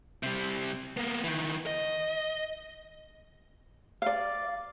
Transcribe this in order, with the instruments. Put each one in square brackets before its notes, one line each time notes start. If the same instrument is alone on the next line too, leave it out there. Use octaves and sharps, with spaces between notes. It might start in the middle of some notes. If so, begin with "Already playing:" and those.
[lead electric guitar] C3 G3
A#3 B3
D#3 E3
D#5
[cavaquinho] D5 F5